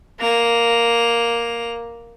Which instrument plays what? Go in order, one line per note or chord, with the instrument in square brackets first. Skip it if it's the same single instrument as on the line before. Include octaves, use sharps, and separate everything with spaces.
[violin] A#3 F7